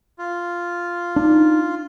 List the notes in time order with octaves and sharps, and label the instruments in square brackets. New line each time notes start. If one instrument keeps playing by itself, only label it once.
[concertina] F4
[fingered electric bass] D4 [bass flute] D#4